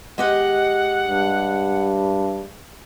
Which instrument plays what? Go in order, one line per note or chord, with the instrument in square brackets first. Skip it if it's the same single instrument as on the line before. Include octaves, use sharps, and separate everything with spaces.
[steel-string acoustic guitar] G#3 G4 D#5 [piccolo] F#5
[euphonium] G2